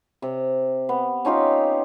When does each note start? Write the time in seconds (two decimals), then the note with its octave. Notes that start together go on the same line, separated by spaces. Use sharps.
0.22 C3
0.89 B3
1.25 C#4 D#4 F4 G4